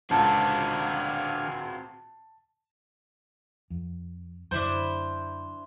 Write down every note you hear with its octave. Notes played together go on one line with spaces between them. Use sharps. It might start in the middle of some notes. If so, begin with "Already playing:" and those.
C#2 A#2 D3 C4 F#4 F5 G#5 A5
F2
F#2 D3 D4 E4 C5